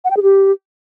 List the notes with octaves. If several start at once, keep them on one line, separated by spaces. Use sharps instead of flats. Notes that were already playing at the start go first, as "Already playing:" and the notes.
F#5
G5
G#4
G4